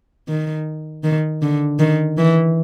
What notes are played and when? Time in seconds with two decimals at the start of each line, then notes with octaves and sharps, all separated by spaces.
0.29 D#3
1.04 D#3
1.42 D3
1.79 D#3
2.18 E3